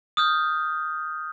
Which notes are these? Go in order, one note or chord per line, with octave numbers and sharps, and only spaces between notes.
D#6 F6 G6